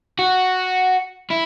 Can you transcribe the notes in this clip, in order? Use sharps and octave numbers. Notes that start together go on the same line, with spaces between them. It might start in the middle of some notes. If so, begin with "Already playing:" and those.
F#4
E4